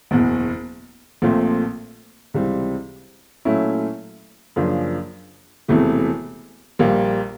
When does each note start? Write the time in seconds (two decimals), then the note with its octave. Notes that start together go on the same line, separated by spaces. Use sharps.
0.11 F#1 E2 B2
1.22 A#1 A#2 F3 A3 C4
2.34 C#2 C3 E3 G3 C4
3.45 A#2 F#3 A3 C#4 E4
4.56 F#2 C#3 F3 A#3 D4
5.68 E1 E2 C3 E3 A3
6.79 A#1 A#2 G3 A#3